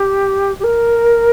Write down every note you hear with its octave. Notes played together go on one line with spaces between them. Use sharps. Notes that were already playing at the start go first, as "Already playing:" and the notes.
Already playing: G4
G4
A#4